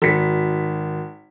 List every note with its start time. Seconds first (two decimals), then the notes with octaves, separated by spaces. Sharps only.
0.02 G#1 B6